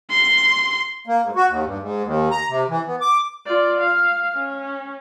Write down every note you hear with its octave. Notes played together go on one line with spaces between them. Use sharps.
C6
A#3
G#2
F#4
D#2
G2
G#2
D#2
A#5
C3
E3
B3
D6
F4 D5
F5
C#4